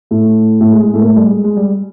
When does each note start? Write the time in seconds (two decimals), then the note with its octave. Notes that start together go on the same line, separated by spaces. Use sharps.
0.11 A2 A3
0.60 A2 A3
0.72 G#3
0.83 G#3
0.93 A2 A3
1.01 A#3
1.04 A2 A3
1.16 G3
1.27 G#3
1.44 G#3
1.57 G3